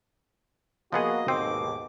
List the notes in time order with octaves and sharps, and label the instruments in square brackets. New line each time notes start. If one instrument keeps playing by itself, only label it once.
[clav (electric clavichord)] F3 B3 G#4 [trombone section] A#3 F#4 [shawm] D#5
[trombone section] D#2 G#2 B2 [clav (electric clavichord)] C4 [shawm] D6